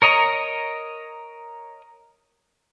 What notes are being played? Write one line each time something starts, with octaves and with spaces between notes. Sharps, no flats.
A#4 C#5 D#5 A#5